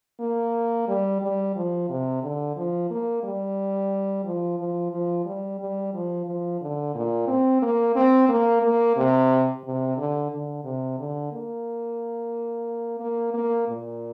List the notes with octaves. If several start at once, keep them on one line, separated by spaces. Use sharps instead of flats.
A#3
G3
G3
F3
C3
D3
F3
A#3
G3
F3
F3
F3
G3
G3
F3
F3
D3
A#2
C4
A#3
C4
A#3
A#3
C3
C3
D3
D3
C3
D3
A#3
A#3
A#3
A#2